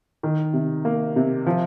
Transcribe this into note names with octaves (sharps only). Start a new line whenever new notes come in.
D#3
C3
A#3
C3
F3